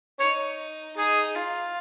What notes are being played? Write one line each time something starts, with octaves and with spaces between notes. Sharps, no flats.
D#4 C#5
D#4 G#4
F4